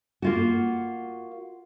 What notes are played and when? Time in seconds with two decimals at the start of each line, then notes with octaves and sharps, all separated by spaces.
0.22 A#3 F4 F#4